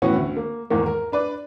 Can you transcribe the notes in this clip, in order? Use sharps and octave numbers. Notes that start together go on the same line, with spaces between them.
A2 E3 B3 C#4 F#4
D2
A#3
E2 G#2 D#3 A#3
A#4
D4 B4 D5